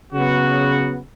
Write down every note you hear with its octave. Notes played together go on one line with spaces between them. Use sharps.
C#3 F#3 B3 F#4